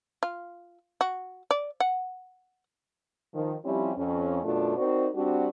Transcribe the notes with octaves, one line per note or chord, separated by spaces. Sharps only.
F4
F#4
D5
F#5
D#3 F3
F3 G3 C4 C#4 E4 G4
F2 C#4
F#2 B2 A3 D4 F4
C4 D#4 F#4 A#4 C5 D5
G3 C4 D4 F#4